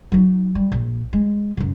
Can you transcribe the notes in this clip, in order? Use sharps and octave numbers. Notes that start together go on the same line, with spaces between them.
F#3 D#4
G3
A#1
G#3
F#2 C#3